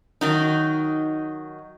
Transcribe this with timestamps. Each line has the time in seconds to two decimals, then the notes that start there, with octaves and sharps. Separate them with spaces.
0.21 D#3 F#3 D#4